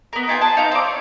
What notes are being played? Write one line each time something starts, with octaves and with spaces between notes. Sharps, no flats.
B3 A#4
D#4 F4 G#4 G5
B4 A5
D#4 F5 G5
C4 D5
C#5